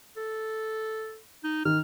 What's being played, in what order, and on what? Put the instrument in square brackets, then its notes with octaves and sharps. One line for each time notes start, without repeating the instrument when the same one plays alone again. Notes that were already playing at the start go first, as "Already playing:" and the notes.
[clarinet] A4
D#4
[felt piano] D#3 [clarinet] F6